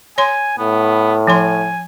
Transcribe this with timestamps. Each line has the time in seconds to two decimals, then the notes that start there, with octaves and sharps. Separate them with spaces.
0.18 C#5 G#5 C6
0.58 A2 B3
1.27 F3 G#5 C6